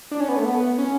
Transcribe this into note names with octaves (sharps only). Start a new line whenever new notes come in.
D4
C#4
B3
A3
B3
C#4